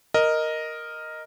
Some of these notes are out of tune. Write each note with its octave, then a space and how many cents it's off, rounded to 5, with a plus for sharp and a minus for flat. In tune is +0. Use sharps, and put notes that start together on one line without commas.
A#4 +0 D#5 +0